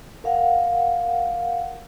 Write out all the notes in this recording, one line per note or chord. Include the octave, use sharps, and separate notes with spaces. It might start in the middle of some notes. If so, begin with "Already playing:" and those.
A#4 F5 F#5